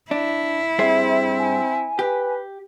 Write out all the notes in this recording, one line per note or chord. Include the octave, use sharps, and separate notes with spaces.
D4 E4
G2 C4 G#4 C5 E5
G#5
G4 B4